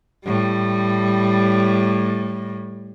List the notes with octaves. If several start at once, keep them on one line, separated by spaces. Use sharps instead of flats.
A2 G3